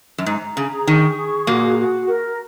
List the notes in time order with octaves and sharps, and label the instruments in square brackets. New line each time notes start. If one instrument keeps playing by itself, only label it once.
[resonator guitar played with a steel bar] F#2
[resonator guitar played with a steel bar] G#2 [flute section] A#5
[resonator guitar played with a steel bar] C#3 [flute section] G#4
[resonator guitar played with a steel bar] D#3 [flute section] C#6
[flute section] G#4
[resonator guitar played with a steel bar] A#2 A#3 [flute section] F#4
[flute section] F#4
A#4